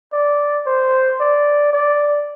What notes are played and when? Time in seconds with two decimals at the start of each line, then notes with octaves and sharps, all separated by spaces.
0.13 D5
0.66 C5
1.20 D5
1.73 D5